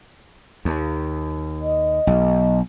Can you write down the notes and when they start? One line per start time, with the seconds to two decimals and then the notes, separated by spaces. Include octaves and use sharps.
0.65 D#2
1.62 D#5
2.07 B1